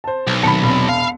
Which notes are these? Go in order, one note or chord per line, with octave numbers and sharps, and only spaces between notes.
C5 A5
B1
F1 D#3 A5 B5 C#7
E1 C2
F5